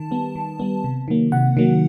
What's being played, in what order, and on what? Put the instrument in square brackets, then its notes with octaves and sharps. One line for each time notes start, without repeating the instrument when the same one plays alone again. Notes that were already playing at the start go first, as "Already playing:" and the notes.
Already playing: [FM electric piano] D#3 A5
G3 B3
D#3
G3 B3
C3
D#3 F#3 A#3
C3 F#5
D#3 F#3 A#3